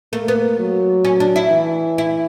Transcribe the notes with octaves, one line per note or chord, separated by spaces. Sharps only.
A3 A#3
B3
F#3
C#4
D4
E4
E3
E4